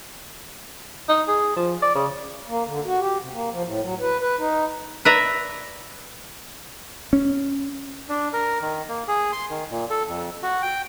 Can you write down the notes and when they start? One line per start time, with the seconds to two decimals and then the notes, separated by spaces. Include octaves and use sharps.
1.09 D#4
1.28 G#4
1.57 F3
1.82 D5
1.95 C#3
2.48 A#3
2.66 D3
2.85 F#4
2.99 G4
3.21 C3
3.33 A#3
3.51 F3
3.64 A2
3.82 F#3
4.00 B4
4.20 B4
4.39 D#4
5.05 B4 D5 E5 A#5
7.13 C#4
8.09 D4
8.33 A#4
8.61 D#3
8.89 A#3
9.08 G#4
9.32 C6
9.50 D#3
9.71 A#2
9.90 A4
10.08 F2
10.43 F#4
10.62 G5